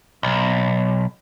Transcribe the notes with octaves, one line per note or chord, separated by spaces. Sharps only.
B1